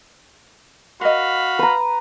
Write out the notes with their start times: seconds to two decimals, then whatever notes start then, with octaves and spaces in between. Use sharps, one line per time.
1.01 F#4 A#4 D#5 F5 B5
1.59 B4 A#5